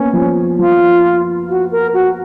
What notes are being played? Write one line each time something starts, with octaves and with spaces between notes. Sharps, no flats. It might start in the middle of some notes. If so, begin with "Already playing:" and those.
Already playing: A#3 B3 C#4
F3
F3 F4
F#4
A#4
F#4